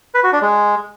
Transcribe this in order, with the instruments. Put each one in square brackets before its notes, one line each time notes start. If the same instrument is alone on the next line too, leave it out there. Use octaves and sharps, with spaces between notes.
[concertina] B4
F#4
D4
G#3